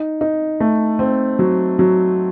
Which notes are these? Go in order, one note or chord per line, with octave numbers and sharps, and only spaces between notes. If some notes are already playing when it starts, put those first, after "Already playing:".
Already playing: D#4
D#4
A3
C4
F#3
F#3